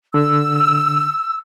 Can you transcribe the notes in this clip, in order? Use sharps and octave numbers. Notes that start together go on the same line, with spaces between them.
D3 E6